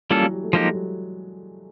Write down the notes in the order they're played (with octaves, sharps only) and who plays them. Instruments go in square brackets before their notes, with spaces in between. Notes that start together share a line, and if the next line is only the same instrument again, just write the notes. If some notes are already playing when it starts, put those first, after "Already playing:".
[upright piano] E3 [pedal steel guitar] G3 A#3 C#4 F4 A4
[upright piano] F#3
G3
A3
[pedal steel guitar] F3 A#3 D#4 G4 [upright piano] G#3
[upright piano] G3
F#3